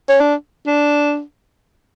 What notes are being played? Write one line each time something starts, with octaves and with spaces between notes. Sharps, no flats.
C#4
D4
D4